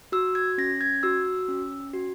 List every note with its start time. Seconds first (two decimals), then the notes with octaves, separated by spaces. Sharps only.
0.12 F#4 E6
0.35 G#6
0.58 C#4 A#6
0.81 G#6
1.03 F#4 E6
1.48 C#4
1.93 F#4